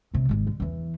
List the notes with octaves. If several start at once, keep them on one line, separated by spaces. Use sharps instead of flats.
C#2 C3
G#1 D#3
D3
E2 E3